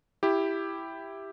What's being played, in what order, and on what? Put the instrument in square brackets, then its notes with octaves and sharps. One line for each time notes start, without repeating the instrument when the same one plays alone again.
[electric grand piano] E4 G4